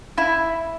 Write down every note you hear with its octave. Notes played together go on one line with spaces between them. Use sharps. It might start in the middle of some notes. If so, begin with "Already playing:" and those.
E4